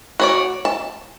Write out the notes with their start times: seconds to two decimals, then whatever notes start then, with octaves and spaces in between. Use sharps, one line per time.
0.20 F#4 C#5 D5
0.65 A5